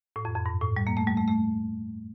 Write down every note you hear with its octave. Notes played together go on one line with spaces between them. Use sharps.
A2
F2
F2
G2
A2
G3
A#3
A3
G3
A3
A3